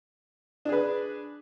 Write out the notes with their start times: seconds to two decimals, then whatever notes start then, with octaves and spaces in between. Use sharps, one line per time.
0.65 D4
0.69 G#4
0.72 B4